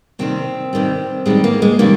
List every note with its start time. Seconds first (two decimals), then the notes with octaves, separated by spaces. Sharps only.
0.19 C3 D#3 G3 C4
0.73 C3 D#3 G3
1.26 C3 D#3 G3 G#3
1.44 A#3
1.62 G#3
1.79 C3 D#3 G3 A#3